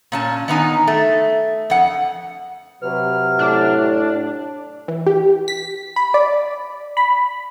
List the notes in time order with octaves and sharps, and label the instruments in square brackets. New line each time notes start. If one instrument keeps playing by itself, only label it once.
[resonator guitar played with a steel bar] A#2 C#4 A5
D#3 B3 D#4 G#5
A3
F2 F#5
[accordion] C3 F#3 F6 [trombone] B4
[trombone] A2 [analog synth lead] D4
[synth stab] E3
G4
B6
B5
D5
B5